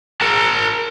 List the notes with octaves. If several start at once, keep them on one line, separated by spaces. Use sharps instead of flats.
A#4 A5